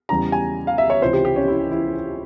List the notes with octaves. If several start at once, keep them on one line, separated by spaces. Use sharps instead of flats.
E2 C#3 G3 A#5
G#5
F5
E5
C#5
C#2 C3 E3 C5
G4
G4
C#4
E4
E4